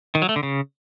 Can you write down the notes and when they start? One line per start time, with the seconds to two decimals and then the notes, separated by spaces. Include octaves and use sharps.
0.15 D#3
0.22 F#3
0.29 A3
0.36 D3
0.43 C#3